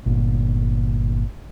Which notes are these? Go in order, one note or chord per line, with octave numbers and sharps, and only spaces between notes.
G1 A#2